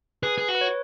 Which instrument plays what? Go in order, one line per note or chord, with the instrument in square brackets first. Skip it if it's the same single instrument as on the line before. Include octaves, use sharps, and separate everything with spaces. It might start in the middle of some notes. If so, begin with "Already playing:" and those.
[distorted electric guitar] G#4 [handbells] B4
[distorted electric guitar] G#4
F#4
[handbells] B4
C#5